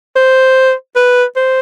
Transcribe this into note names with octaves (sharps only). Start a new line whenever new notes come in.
C5
B4
C5